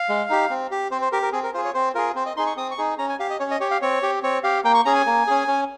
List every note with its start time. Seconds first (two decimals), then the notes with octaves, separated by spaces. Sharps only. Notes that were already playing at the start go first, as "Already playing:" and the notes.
Already playing: F5
0.09 G#3
0.30 D#4 G4
0.50 C4
0.71 G4
0.91 C4 C5
1.01 C5
1.12 G4 A#4
1.22 A#4
1.32 C4 G#4
1.44 A#4
1.54 F4 G#4 C5
1.65 C#5
1.74 C4 C5
1.95 F4 G#4 A#4
2.15 C4 C5
2.26 D#5
2.37 D#4 G#4 C6
2.47 C#6
2.57 C4 D#6
2.71 C#6
2.78 D#4 G#4
2.98 C#4 A#5
3.09 G#5
3.19 G4 F5
3.30 D#5
3.40 C#4 C#5
3.51 D#5
3.60 G4 C#5
3.71 F5
3.82 C4 C#5
4.03 G4
4.23 C4 C#5
4.44 G4 F5
4.64 A#3 G5
4.74 C#6
4.85 C#4 G#4 A#5
4.95 G#5
5.06 A#3
5.27 C#4 G#4
5.48 C#4